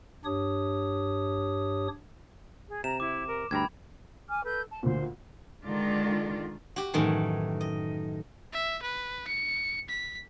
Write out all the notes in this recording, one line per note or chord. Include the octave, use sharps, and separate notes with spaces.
G2 D4 G4 C#5 D#6
G#4
C3 A#5 E7
E4 D6
A#4
D2 G2 G5 A#5 B5 G#6
G#5 D6 F6
A4 B4 G6
A5
D2 A#2 C5
D3 D#3 G#3 F4 D5
F#4 G4
F#2 A2 D#3 E3
D#5
E5
B4
C#7
B6